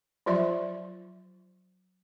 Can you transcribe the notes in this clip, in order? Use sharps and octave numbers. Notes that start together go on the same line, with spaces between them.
F3 F#3 F4 D5 E5